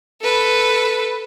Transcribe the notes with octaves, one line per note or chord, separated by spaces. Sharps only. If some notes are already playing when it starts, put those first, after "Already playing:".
A4 B4